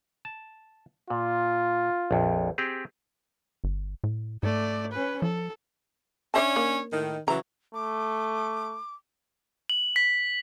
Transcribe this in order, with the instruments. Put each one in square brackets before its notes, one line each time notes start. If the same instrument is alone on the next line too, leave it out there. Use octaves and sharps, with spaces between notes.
[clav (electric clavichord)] A5
[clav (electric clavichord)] A#2 [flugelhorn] F4
[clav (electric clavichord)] A#1 F2
C4 G4 G#4
[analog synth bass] G1
A2
[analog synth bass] G#2 [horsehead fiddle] A3 D5
[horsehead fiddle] C#4 B4
[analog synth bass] F3 [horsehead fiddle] A4
[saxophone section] C#4 D4 C#5 [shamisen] D5 E5 A5
[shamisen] A#3
[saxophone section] A2 D#3
[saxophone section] C#3 E3 F#3 [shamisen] A#5
[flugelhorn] A3 [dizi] D6
[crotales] F#7
B6